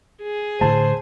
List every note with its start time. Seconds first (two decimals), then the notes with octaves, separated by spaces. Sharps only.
0.22 G#4
0.61 A2 D3 A3 C5 A5